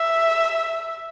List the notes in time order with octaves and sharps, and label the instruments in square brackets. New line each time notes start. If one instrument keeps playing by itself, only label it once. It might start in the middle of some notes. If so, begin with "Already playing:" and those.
Already playing: [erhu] E5